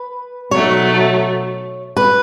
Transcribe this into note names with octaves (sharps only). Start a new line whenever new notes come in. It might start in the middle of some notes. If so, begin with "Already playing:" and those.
Already playing: B4
B2 F#3 A3 D#4 C#5
B4